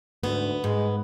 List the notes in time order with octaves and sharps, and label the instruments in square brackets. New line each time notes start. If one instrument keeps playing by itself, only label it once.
[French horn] D2 [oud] G#2 [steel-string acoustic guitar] B3
[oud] G#2 [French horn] G#3